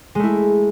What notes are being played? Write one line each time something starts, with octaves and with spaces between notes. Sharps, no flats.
G#3 A3 E4